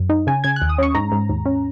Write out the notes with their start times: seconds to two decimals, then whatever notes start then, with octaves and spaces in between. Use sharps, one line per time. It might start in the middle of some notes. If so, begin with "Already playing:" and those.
Already playing: F#2
0.09 D#4
0.27 C#3 G#5
0.44 C#3 G#6
0.56 F#6
0.62 D#2
0.69 D#6
0.78 C#4 C#6
0.95 G#2 A#5
1.12 G#2
1.29 D#2
1.46 C#4